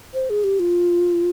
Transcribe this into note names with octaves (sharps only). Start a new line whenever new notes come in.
C5
G#4
G4
F4